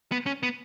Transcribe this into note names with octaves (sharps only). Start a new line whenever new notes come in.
B3
C#4
B3